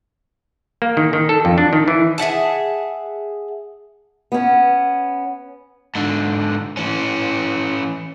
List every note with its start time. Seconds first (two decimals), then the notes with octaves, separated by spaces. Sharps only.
0.82 A#3
0.97 D#3
1.13 D#3
1.29 A4
1.45 F2
1.58 D4
1.73 D#3
1.88 E3
2.18 G#4 E5 F#5 A5
4.32 B3 C#4
5.95 G#2 D3
6.77 E3 C#4